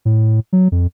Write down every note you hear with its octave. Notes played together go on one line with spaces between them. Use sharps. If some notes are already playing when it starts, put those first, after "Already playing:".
A2
F#3
F2